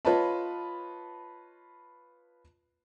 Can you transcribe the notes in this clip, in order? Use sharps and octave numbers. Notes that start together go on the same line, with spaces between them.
F4 B4 C#5 D#5 A5 B5